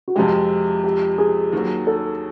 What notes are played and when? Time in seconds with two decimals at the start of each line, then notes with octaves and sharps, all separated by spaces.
0.08 F#4
0.16 F2 C3 F3 G#3 G4
0.84 G4
1.18 G#4
1.53 D#2 D#3 F#3
1.87 A4